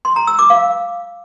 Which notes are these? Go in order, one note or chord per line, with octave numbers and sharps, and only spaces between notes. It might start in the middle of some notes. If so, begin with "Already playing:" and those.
C6
A#5
E6
D6
F5